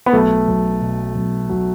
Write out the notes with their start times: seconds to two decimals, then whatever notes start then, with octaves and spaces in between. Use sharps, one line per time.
0.06 B3
0.13 B1 A3
0.48 B1
0.81 B2
1.15 B1
1.49 B1 F#3